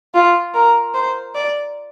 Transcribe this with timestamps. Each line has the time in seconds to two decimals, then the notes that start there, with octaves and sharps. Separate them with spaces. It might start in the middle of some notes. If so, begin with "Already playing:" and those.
0.14 F4
0.54 A#4
0.94 C5
1.35 D5